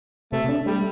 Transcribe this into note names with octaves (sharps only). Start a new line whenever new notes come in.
C3 A3
D4
G3 A3